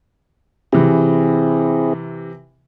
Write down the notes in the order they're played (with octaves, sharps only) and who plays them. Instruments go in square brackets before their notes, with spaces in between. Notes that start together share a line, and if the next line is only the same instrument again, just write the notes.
[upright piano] C3 E3 [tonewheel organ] C4 E4 G#4